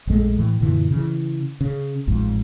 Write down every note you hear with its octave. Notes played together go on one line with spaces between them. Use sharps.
A#1 F2 G#3 A3
A2 E3
F#2 A#2 D3 E3
C#3 E3
C#3
A1 F2 G#2